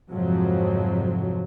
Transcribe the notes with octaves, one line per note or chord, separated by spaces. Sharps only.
F2 G#2 C3 F3 F#3